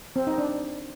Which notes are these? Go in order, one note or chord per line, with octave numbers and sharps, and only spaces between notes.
C4
D#4
D4